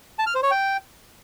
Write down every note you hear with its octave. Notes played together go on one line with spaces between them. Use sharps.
A5
F6
C5
C#5
G5